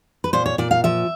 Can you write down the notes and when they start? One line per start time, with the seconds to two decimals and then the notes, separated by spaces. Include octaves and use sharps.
0.24 B4
0.33 A#2 C5
0.46 C#5
0.58 A#2 D5
0.71 F5
0.84 F3 E5